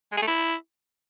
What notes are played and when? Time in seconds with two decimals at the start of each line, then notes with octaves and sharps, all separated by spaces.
0.12 G#3
0.17 G#4
0.22 A3
0.27 E4